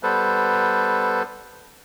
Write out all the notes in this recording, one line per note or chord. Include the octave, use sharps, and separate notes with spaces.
G3 B3 A4 B4 C5